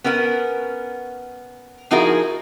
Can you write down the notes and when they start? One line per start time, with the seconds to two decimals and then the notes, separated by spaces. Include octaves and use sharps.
0.04 B3 C#4 A#4 F#5
1.91 F3 D#4 E4 F#4 G#4 A#4